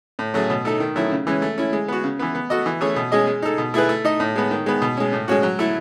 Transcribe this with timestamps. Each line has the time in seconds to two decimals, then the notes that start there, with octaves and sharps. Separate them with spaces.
0.19 A2
0.34 F#3 A3 C#4 G#4
0.50 B2
0.65 A3 D#4 A4
0.80 D#3
0.96 F#3 A3 C#4 E4
1.12 C#3
1.27 E3 G#3 C#4
1.42 A3
1.58 C#4 E4
1.73 G#3
1.88 B3 F#4
2.04 C#3
2.19 E3 B3
2.35 B3
2.50 F#4 A4 D#5
2.66 E3
2.81 A3 C#4 G#4 C#5
2.96 B2
3.12 G#3 C#4 G#4 D#5
3.27 G#3
3.42 D#4 A4
3.58 B2
3.74 A3 E4 G#4 B4
3.89 A3
4.05 D#4 A4 D#5
4.20 A2
4.36 G#3 B3
4.51 D#3
4.66 G#3 B3
4.82 B2
4.97 G#3 C#4
5.13 A2
5.28 G#3 C#4 F#4
5.43 F#3
5.59 A3 E4 A4